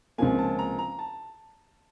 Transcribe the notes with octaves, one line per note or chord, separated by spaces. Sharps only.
C#2 C3 F3 A#3 G#5
A5
A#5
A#5
A5